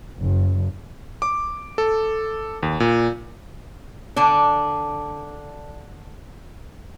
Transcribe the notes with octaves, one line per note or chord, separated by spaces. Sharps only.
F#1
D6
A4
D#2
A#2
D3 D4